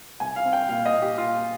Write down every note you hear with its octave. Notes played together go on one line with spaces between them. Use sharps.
C2 G#5
F5
C4
G5
A#2 F5
D#5
A#2
G4
A#2 F4